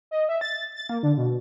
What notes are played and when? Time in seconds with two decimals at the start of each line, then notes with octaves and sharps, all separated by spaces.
0.11 D#5
0.29 E5
0.41 A6
0.75 A6
0.89 A#3
1.03 D3
1.17 B2